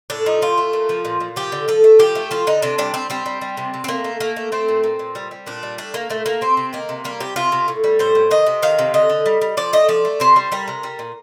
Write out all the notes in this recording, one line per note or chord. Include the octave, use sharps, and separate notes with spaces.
A2 D4
F3 D#4
A2 F4
A3
A#2
F3
A#2
A#2
F3 G4
D3
F3 A4
A3
F3 G4
A3
F3 F4
D3 D#4
C3 D4
G3 D4
G3 C4
G3 C4
G3
G3
C3
C3
C4
A3 A#3
A3
A3 A#3
A3
A3 C4
A#2
A#2
A#2
G3
G3
A#2 D4
G3
A3 D4
A3 A#3
A#2 A3
A3 A#3
C3 C4
C3
D#3 A#3
C3
G3 A#3
C3 G4
C3 F4
C3
A2
G3
A2 C5
A2
D#3 D#5
C3
D#3 F5
C3
D3 D#5
D3
G3
G3
F3 D5
A3 D#5
F3 D5
A3
C3 C5
G3
G3 A#4
C3
G3
A#2